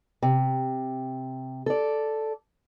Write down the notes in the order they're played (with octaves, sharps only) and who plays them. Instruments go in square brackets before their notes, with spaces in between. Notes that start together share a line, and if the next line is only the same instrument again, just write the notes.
[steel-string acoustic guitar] C3
A4 D5